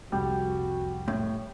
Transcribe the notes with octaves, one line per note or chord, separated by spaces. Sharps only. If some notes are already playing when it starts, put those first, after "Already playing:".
C2 F2 C3 G3 F#4
A2